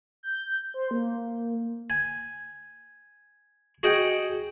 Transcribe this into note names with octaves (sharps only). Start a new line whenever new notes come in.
G6
C5
A#3
G#5
F#4 G#4 D#5 F#5 G5